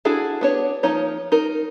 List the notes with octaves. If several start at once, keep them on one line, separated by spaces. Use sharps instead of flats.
D4 E4 F#4 G#4 A4
B3 D4 C#5
F3 A#3 D#4 C#5
D#4 A#4